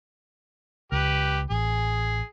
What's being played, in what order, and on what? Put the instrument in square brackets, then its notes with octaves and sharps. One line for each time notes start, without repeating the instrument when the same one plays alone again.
[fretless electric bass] C#2 [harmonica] G4 B4
[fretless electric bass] A1 [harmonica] G#4